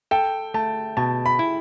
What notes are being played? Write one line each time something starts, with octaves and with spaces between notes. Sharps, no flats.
A4 G5
A3 A5
B2 A5
B5
E4